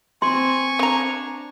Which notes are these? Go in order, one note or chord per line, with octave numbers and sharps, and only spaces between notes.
C4 G#5 C6 C#6
C4 D4 A#5